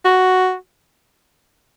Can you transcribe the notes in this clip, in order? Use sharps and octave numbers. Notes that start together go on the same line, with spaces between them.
F#4